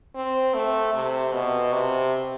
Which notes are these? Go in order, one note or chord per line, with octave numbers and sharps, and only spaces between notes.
C4
A3
C3
B2
C3